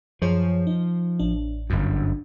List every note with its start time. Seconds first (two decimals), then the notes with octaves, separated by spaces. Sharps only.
0.22 F#2 F3 G#4 C#5
0.67 D#4
1.19 A1 D4
1.70 G1 F#2